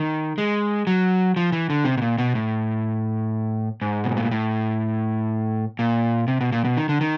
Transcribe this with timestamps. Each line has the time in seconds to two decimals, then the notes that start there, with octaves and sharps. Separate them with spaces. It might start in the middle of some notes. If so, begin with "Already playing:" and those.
Already playing: D#3
0.38 G#3
0.87 F#3
1.36 F3
1.52 E3
1.70 D3
1.85 C3
1.97 B2
2.02 A#2
2.18 B2
2.35 A2
3.82 G#2
4.04 B2
4.17 A#2
4.31 A2
5.79 A#2
6.28 C3
6.41 B2
6.52 A#2
6.65 B2
6.77 D#3
6.89 D3
7.01 D#3